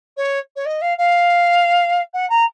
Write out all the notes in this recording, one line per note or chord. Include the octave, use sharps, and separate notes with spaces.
C#5
C#5
D#5
F5
F5
F#5
A#5